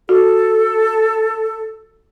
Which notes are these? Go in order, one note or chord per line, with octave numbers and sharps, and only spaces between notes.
F#4 A4